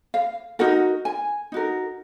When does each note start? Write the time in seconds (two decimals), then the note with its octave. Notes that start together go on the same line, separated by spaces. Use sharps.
0.14 F5
0.59 D#4 F#4 A#4 F#5
1.05 G#5
1.52 D#4 F#4 A#4